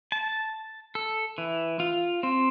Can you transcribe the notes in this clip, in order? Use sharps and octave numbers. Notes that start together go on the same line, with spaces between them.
A5
A4
E3
F4
C4